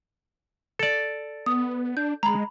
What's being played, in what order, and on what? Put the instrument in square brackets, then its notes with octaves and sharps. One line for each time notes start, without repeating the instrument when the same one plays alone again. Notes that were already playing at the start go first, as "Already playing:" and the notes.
[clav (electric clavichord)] A4 D5
[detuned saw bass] B3 [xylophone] D#6
[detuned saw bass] D4 [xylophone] G6
[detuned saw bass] G#3 [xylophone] A#5 B5